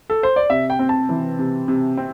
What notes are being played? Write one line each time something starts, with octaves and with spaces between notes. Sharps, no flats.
A4
C5
D5
C3 E5
G5
C4
A5
E3
C3
C3
C4